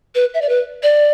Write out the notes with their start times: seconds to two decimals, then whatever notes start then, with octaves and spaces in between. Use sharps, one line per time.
0.15 B4
0.34 E5
0.42 D5
0.49 B4
0.83 D5